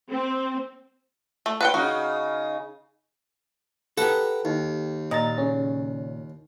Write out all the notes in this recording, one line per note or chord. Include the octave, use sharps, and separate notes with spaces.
C4
A3
B4 F#5 G5
C#3 D#4 F#4
G4 A4 B4 F#5 A#5
D#2
A#2 D#5 A#5 A6
C#3 C#4